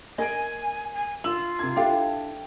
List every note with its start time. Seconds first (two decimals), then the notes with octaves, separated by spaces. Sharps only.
0.18 A#3 D#5 G#5 D7
0.94 G#5
1.24 F4 E6 F#7
1.59 C3 G#6
1.76 D4 E4 G4 A4 E5 F5